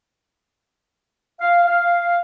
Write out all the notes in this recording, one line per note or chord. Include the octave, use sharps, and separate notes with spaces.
F5
F5